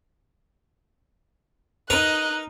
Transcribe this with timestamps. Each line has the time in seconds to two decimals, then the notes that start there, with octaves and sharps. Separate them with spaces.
1.90 D#4 A#4 B4 D#5 A#5 F#6